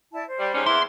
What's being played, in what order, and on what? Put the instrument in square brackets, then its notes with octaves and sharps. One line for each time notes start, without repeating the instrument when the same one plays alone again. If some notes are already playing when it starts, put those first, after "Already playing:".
[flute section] E4 D5 A5
C5
[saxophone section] G3
G#2 G3 C#4
[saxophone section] E2 A#3 E4 [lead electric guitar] C6